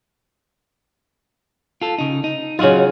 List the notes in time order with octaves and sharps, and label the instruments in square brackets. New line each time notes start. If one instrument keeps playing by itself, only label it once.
[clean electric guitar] F4 A4
C#3 D#4
D#4
[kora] C#3 F4 [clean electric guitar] F#3 D#4 F#4